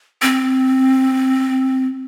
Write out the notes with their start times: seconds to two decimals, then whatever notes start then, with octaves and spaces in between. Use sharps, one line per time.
0.22 C4